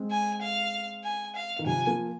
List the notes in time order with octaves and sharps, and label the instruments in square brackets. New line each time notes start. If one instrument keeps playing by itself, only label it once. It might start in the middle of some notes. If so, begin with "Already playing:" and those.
Already playing: [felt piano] G#3 C4
[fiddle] G#5
F5
G#5
F5
[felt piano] D#3
[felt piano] C3 F3 [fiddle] G#5
[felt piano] F3 A#3